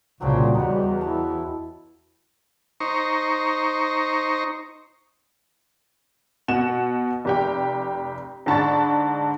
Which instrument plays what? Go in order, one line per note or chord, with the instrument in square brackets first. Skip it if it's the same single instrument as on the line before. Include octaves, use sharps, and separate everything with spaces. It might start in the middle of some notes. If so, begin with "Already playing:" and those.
[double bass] C2 C#3 [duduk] A#2 [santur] F#3 C4 D4
[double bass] E2 [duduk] G3 [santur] D#4 F#4
[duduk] E4 [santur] A5
[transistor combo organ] D#4 C5 A#5 C#6
[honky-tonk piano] B2 F#5 E7
F1 G4 G5
G#2 D3 A5 B5 C#6 A6